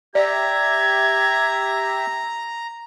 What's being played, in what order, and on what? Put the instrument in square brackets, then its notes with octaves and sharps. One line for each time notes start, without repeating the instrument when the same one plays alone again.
[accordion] G4 E5 [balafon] D5 [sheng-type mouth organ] A#5 [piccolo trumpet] G#6